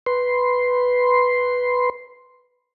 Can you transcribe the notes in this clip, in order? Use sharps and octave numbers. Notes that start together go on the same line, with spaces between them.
B4 C6